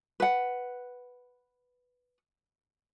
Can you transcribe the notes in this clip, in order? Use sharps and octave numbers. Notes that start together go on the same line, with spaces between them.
B4 F#5